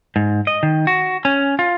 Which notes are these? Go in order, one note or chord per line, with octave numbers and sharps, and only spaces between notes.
G#2
D#5
D#3
F#4
C#4
F4